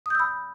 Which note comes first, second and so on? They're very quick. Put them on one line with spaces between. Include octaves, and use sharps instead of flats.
D#6 G6 E6 B5